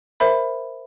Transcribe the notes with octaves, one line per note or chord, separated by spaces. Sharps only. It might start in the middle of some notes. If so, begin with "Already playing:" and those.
A#4 C5 E5 B5